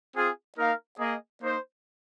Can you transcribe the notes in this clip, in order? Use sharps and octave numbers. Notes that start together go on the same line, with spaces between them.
C4 F4 G#4
A#3 D#4 A#4 F5
A#3 G#4 D#5
A#3 D#4 C5